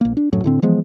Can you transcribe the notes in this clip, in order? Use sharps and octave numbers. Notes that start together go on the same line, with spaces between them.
A#1 A#3
D4
D1 F#2 A2 F#3
A2 D3 C4
E3 F3 G#3 B3